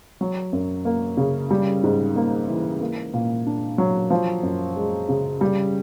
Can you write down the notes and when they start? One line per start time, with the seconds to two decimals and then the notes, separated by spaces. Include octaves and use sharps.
0.21 F#3
0.53 F#2
0.85 A#3
1.17 C#3
1.51 G3
1.83 G#2
2.16 A#3
2.48 E3
2.81 A#3
3.14 A#2
3.46 D4
3.78 F#3
4.10 F3
4.43 F#2
4.76 G#3
5.09 C#3
5.41 G3